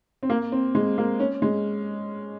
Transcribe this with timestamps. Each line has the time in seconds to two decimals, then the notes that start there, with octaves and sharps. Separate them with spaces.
0.23 C4
0.30 A#3
0.52 C4
0.75 G#3
0.98 A#3
1.20 C#4
1.42 G#3